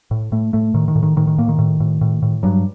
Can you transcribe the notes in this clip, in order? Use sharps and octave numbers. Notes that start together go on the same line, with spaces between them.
A2
A2 A3
A2 A3
A2 D#3
D#3
A2
D#3
A2 D#3
D#3
A2 A#3
D#3
A2
A2
A2
A2
G2 F#3